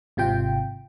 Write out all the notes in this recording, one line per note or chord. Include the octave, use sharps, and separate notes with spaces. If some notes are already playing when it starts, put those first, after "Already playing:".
G#1 C3 F4 G5